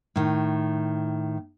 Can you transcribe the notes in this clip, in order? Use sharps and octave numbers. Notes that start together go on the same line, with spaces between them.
A2 D#3